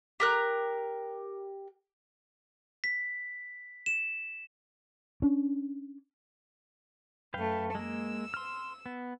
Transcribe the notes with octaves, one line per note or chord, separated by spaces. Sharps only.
G4 A#4 F#6
B6
E7
C#4 D4
F#2 A3 B4 F5 G5
G#3 A#3 E6
C6 F6
B3